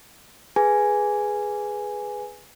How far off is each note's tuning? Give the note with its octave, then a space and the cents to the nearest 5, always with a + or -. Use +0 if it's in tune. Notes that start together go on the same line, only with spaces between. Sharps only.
G#4 +0 B4 +0 G#5 +0